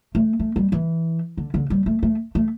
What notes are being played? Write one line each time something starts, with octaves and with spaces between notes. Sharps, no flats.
A3
A3
G3
E3
D3
D3
G3
A3
A3
A3